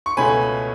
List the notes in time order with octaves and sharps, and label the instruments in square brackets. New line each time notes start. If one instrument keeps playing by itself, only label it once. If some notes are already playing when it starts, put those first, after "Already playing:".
[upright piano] C#6
C#2 B2 A3 C#4 G#5 B5